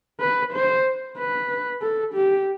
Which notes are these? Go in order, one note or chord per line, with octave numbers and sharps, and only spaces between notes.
B4
C5
B4
A4
G4